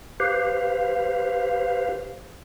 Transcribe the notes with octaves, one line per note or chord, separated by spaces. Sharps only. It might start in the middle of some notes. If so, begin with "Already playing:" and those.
G4 B4 C5 F5